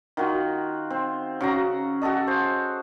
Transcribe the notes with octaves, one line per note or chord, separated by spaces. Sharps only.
D#3 F4 F#4
C4
C#3 F#4 A#5
F#4 G#4 A4 D#5
C5